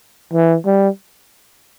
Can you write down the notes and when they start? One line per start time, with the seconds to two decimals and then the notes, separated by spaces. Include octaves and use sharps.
0.33 E3
0.66 G3